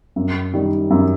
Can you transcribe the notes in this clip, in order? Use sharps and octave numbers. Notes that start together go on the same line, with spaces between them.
F#2
D#3 G3
F#2